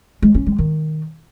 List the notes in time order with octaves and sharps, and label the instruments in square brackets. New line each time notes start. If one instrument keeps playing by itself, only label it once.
[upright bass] G#3
C#4
G#3
D#3